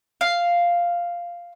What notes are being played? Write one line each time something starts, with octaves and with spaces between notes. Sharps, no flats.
F5